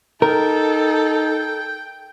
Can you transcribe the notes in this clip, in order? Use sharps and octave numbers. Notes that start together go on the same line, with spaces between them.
D#4 A4 A#4 G5